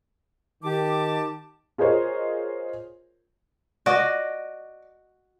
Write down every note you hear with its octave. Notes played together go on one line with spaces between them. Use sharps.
D#3 G4 A5 D6
F4 G#4 A#4 C5 C#5 D#5
F#4 D5 D#5